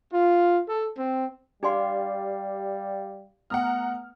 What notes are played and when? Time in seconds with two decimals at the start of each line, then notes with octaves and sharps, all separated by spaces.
0.13 F4
0.68 A4
0.97 C4
1.63 G3 D4 G4 D5 F5 G#5 C6
3.50 A3 B3 F#5 A#5 D#6 F6